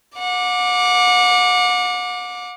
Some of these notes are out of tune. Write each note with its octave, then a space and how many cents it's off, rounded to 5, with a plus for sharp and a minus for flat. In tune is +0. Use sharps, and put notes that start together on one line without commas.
F#5 -35 D6 +0